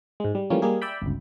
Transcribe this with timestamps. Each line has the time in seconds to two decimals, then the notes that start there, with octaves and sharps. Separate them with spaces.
0.20 G#2 G#3
0.35 G3
0.50 E3 F3 G3 A3 A#3 C#4
0.62 G3 G#3 A#3 G#4
0.82 D5 E5 G5 B5
1.02 G1 C#2